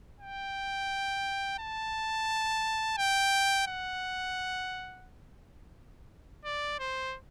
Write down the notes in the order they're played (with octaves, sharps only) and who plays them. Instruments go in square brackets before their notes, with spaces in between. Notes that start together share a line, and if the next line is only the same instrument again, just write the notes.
[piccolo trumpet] G5
A5
G5
F#5
D5
C5